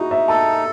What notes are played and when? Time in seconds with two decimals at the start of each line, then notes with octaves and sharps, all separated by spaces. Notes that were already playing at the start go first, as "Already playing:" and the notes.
Already playing: D#4 E4 F#4 G#4
0.11 E5
0.28 A4 A5